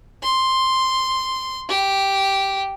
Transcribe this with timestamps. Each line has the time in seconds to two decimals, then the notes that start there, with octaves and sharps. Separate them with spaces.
0.23 C6
1.69 G4